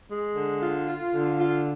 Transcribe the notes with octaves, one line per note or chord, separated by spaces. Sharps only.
G#3
D3
F4
F4
D3
F4